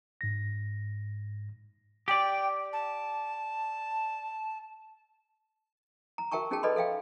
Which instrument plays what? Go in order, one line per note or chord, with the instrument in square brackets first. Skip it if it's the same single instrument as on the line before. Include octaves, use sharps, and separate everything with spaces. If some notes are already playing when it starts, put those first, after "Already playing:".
[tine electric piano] G#2 A#6
[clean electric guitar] G4 D5 [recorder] G5
[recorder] A5
[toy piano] A#5
F#4 A#4 E5 G5 A5 C#6
C#4 D#4 F#4 G#4 G5 A5
A4 B4 D5 D#5 B5 C6
A4 E5 F5 G5